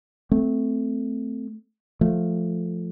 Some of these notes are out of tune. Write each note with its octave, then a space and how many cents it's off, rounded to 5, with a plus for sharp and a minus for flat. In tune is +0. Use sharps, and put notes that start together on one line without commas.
A3 +0 C4 -15
F3 +0 A3 +0